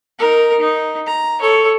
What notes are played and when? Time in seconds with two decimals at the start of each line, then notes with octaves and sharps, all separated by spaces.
0.19 D#4 A#4
0.60 D#4
1.06 A#5
1.41 A4 C#5